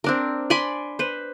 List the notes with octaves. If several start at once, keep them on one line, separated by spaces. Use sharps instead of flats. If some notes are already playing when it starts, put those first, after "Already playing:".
C4 D4 A#4
D5 G#5 B5 C6
B4 C5